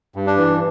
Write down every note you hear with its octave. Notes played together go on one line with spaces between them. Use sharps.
G2
D4
E3